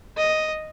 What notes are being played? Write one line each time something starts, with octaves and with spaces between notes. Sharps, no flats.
D#5